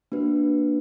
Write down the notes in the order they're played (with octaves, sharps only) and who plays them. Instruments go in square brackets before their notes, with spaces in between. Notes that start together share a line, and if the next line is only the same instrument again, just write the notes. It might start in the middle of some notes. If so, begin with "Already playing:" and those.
[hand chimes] A#3 D4 F#4 B4